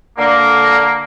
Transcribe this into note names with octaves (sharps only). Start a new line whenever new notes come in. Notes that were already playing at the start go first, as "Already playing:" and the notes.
D3 A#3